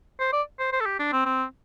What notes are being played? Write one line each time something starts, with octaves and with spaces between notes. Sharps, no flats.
C5
D5
C5
C5
A4
G4
D4
C4
C4